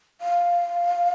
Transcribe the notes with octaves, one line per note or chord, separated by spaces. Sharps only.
F5